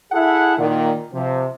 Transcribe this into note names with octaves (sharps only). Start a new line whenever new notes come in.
E4 G#4 A4 E5 F#5
A#2 D#3
C3 F3